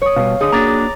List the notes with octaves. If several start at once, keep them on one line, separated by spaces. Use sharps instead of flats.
C#5 D#6
B2 G3 F5
D3 D#4 G#4 D#6
A#3 D4 F#4 A#5 D6 A6